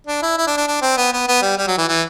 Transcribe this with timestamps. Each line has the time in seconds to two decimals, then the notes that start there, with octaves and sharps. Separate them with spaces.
0.07 D4
0.22 E4
0.38 E4
0.47 D4
0.57 D4
0.67 D4
0.82 C4
0.98 B3
1.13 B3
1.28 B3
1.42 G3
1.58 G3
1.67 F#3
1.78 E3
1.88 E3